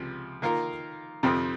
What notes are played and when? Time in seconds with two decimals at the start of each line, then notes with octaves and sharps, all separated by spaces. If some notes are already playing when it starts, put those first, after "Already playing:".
Already playing: C#2 C3 F3
0.42 D#3 A#3 F4 A#4
1.23 F2 C3 F3 C4